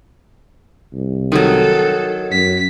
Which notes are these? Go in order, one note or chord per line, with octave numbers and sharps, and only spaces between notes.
C2
D#3 F#3 A4
F#2 B6